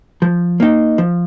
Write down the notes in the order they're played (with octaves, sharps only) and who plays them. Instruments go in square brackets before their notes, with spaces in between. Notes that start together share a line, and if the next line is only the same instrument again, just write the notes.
[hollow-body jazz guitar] F3
A#3 D#4
F3